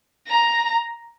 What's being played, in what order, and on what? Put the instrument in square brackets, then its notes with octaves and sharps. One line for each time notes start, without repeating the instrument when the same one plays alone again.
[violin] A#5